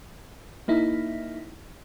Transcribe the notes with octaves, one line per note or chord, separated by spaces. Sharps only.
A#3 D#4 E4